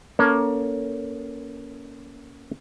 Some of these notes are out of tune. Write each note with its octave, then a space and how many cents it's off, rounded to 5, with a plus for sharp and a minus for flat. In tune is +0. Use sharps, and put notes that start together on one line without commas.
A#3 +25 C#4 +20 A4 +35